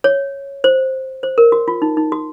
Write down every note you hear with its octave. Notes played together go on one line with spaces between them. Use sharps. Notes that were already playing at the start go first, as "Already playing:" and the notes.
C#5
C5
C5
A#4
F#4
F4
D#4
D#4
F#4